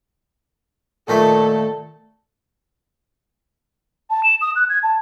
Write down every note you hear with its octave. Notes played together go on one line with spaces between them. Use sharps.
A#2 D#3 A3 A4
A5
E7
D#6
F#6
G#6
A5